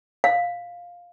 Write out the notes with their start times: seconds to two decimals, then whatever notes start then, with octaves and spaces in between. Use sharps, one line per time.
0.24 F5